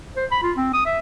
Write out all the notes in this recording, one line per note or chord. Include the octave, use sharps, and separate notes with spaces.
C5
B5
F4
C4
D#6
E5